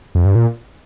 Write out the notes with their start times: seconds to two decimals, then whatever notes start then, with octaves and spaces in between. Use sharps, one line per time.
0.15 F2
0.25 G2
0.35 A#2